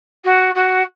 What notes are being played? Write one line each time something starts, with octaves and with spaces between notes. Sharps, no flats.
F#4
F#4